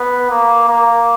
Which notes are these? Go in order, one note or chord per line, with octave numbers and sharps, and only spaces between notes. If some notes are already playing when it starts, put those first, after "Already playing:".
Already playing: B3
A#3
A#3